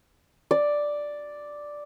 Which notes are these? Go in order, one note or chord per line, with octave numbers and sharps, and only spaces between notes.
D5